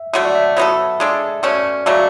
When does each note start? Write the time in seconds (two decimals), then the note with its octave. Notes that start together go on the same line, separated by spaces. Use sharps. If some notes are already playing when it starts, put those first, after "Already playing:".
Already playing: E5
0.13 D3 F#3 A3 E5
0.25 D5
0.35 E5
0.57 F#3 B3 F#4 A4 E5
1.00 G#3 D4 A4
1.43 B2 A3 C#4 D5
1.86 C#3 F#3 A3 D5